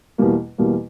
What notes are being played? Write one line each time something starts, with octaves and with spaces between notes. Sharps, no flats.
E2 B2 G3 A#3
E2 B2 G3 A#3